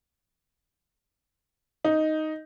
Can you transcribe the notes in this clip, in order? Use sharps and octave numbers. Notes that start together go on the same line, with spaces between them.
D#4